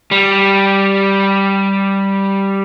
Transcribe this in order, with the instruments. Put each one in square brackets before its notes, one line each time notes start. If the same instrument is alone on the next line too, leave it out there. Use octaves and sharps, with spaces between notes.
[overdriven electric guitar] G3